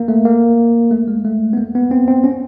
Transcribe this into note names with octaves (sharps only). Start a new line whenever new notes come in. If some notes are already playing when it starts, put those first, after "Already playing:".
Already playing: A#3
A3
A#3
A3
G#3
A3
B3
A#3
B3
C4
C4
C#4